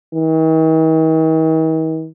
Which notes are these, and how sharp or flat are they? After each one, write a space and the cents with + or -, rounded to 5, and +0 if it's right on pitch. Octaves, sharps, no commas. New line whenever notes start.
D#3 +45